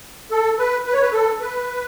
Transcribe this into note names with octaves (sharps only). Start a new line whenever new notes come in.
A4
B4
B4
C#5
B4
A4
B4